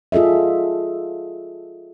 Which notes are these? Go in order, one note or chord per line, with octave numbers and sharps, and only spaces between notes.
F4 G#4 A4 D#5 E5